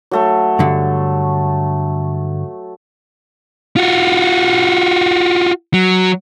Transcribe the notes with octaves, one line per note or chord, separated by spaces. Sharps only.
F#3 A3 C#5
G2 D3
F4 F#4
F#3